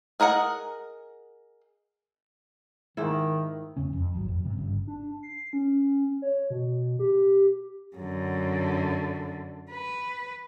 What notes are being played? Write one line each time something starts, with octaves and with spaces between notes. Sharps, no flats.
G#4 A#4 D#5 F#5
G#2 D#3 E4
E2 C#3 C#4
F2
D#1 G#1 F#3
F2
G#2 C3
G1 G2 C#3
D4
C7
C#4
C#5
B2
G4
F#2 D3
B4